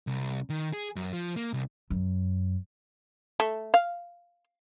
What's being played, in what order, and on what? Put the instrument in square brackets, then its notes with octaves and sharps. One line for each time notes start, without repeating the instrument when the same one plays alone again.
[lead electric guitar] C2
D#3
G#4
F#2
F3
A#3
C2
[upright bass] F#2
[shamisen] A3
F5